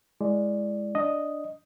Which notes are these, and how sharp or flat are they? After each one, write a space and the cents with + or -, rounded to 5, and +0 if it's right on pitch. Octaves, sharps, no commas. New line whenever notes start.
G#3 +0 E4 +0 D5 +0
D4 +0 D#5 +0